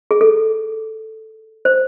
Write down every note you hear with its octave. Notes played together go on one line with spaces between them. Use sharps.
G#4
A4
C5